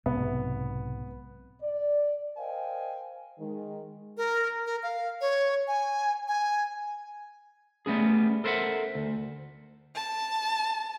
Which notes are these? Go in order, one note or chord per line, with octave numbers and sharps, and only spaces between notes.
B1 G#2 C3 B3
D5
A#4 C5 D#5 F5 G5 G#5
D#3 G#3
A#4
A#4
F5
C#5
G#5
G#5
G3 A3 B3 C#4 G#4
A4 A#4 C5 C#5 E5 F#5
D2
A5